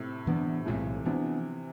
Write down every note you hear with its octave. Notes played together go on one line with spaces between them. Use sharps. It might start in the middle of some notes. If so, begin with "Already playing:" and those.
Already playing: A2 C3
G#2 E3 B3 D4
B1 A2 C3 E3 G#3
C3 E3 F3 B3 D4